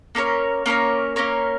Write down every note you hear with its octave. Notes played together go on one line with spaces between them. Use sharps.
A#3 C#4 A#4 C#5
A#3 C#4 A#4 C#5
A#3 C#4 A#4 C#5